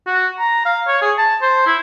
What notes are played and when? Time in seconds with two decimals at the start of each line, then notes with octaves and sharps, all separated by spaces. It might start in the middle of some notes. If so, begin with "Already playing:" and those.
0.07 F#4
0.39 A#5
0.65 F5
0.87 C#5
1.02 G#4
1.18 A5
1.42 C5
1.67 E4